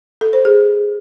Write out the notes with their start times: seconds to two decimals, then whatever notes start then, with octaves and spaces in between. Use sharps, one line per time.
0.21 A4
0.33 C5
0.45 G#4